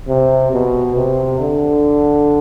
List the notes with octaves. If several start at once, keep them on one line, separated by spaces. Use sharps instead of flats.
C3
B2
C3
D3